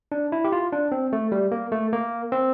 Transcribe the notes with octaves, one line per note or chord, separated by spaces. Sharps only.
D4
E4
G4
F4
D4
C4
A3
G3
A#3
A3
A#3
C4